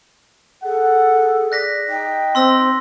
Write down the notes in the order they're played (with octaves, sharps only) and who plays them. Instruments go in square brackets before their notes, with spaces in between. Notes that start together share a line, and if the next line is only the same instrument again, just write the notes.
[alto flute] G#4 [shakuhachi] A4 [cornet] F#5
[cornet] D5 [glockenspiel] F#6 A#6 B6
[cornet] D#4 [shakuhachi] G5
[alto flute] C4 [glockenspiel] C6 E6 A#6